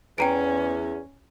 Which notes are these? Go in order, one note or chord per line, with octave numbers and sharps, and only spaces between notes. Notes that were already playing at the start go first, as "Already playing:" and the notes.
E2 C#4 G5 A#5 D7